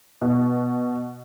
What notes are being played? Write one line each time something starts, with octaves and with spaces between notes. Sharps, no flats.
B2